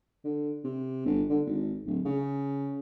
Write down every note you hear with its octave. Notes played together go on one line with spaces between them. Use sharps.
D3
C3
G1
D3
G#1
D1
C#3